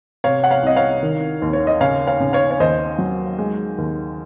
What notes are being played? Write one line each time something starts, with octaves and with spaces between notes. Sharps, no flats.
C3 C#5 F5
F#5
C#5 F5
C2 D#5
C#5 F5
D#3
D#2
C#5
D#5
C#3 C#5 F5
C#5 F5
C#3
C#5 F5
C#5
D#2 C5 D#5
F#3
G#3
D#2